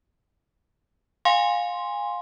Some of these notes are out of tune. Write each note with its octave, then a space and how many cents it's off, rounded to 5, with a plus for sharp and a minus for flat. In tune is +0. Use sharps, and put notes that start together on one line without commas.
F5 +25 G#5 -25 C6 +0